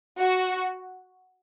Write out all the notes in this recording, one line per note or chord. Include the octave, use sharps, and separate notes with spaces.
F#4